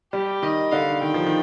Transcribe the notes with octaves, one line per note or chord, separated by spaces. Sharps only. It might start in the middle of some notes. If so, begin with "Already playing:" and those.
G3 G4
D#3 D#5
D3 F5
D#3 G5
F3
D#3